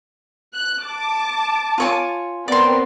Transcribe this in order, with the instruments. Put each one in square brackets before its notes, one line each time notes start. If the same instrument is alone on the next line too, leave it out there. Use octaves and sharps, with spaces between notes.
[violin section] F#6
A5 D6
[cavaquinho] F4 C#5 G#5
[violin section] B3 C4 A#4 [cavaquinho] D5 C6